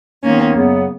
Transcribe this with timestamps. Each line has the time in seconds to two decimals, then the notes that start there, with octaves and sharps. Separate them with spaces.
0.23 D#2 D#3 G#3 A#3 B3 C#4 D#4
0.55 F#2 C#3 F#3 B3